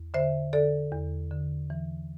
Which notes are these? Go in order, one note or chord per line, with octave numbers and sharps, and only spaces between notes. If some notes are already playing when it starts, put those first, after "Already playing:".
Already playing: E2
D3 C5 E5
D3 A4 D5
E2
D3
E3